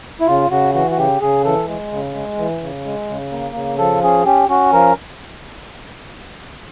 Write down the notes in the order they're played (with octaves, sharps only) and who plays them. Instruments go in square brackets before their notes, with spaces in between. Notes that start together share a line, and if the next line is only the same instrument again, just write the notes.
[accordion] E4
C#3 F4
C#3 F#4
E3 F#4
F#4
C#3 G4
C#3 G#4
E3 A4
G#3
C#3
G#3
E3
C#3
G#3
C#3
A#3
C#3
F3 A4
C#4 G#4
C#4 G4
C#4 F#4
F3 A#4